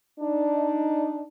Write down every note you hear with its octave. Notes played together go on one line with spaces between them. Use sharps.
D4 D#4